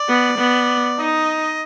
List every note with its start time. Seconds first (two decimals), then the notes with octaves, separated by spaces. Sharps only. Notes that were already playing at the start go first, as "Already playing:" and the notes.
Already playing: D5
0.09 B3
0.38 B3
0.99 D#4 D#5